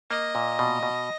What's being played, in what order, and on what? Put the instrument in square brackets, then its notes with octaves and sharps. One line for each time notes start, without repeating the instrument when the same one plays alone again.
[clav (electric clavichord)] A#3 [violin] D#5
[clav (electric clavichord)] A#2
B2
B2